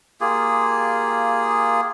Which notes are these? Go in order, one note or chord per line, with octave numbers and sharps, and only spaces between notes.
A#3 F4 G4 G#4